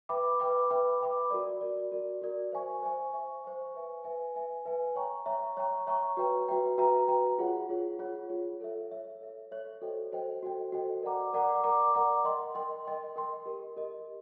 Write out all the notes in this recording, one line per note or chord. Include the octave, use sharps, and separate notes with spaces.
B4 E5 G5 B5 D6
B4 E5 G5 B5 D6
B4 E5 G5 B5 D6
B4 E5 G5 B5 D6
F#4 A#4 D5
F#4 A#4 D5
F#4 A#4 D5
F#4 A#4 D5
C5 E5 G#5 C#6
C5 E5 G#5 C#6
C5 E5 G#5 C#6
C5 E5 G#5 C#6
B4 E5 G#5
B4 E5 G#5
B4 E5 G#5
B4 E5 G#5
C#5 E5 G5 A#5 C#6
C#5 E5 G5 A#5 C#6
C#5 E5 G5 A#5 C#6
C#5 E5 G5 A#5 C#6
F#4 B4 E5 G5 A#5
F#4 B4 E5 G5 A#5
F#4 B4 E5 G5 A#5
F#4 B4 E5 G5 A#5
F4 G#4 C#5 F#5
F4 G#4 C#5 F#5
F4 G#4 C#5 F#5
F4 G#4 C#5 F#5
A4 C#5 E5
A4 C#5 E5
A4 C#5 E5
A4 C#5 E5
F#4 A4 C5 D#5 G5
F#4 A4 C5 D#5 G5
F#4 A4 C5 D#5 G5
F#4 A4 C5 D#5 G5
A#4 D5 F#5 A#5 D6
A#4 D5 F#5 A#5 D6
A#4 D5 F#5 A#5 D6
A#4 D5 F#5 A#5 D6
A#4 D#5 G5 C6
A#4 D#5 G5 C6
A#4 D#5 G5 C6
A#4 D#5 G5 C6
G4 A#4 D#5
G4 A#4 D#5